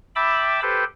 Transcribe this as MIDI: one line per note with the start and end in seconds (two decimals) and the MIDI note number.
0.16 0.60 76
0.16 0.60 79
0.16 0.60 81
0.16 0.60 83
0.16 0.60 86
0.16 0.60 88
0.62 0.84 67
0.62 0.84 69
0.62 0.84 71
0.62 0.84 72
0.62 0.84 79